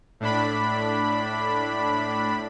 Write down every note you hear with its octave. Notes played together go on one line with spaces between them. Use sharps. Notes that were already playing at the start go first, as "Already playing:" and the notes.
A2 D4 B5